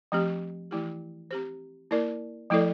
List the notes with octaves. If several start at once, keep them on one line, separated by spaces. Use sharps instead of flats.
F3 A3 C4 G4
E3 A3 E4 G4
C4 G4 C5
A#3 E4 A#4 D5
F3 A3 E4 A4 D5